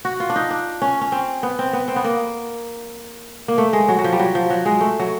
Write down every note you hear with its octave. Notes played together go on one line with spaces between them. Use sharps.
F#4
F4
D4
D#4
D4
C#4
C#4
C4
B3
C4
B3
C4
B3
A#3
A#3
A3
G#3
F#3
F#3
F3
G3
F#3
F3
F#3
G#3
A3
F#3